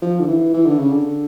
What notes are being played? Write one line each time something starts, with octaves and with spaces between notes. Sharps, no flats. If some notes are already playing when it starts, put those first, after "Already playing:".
F3
D3
E3
E3
D3
C#3
D3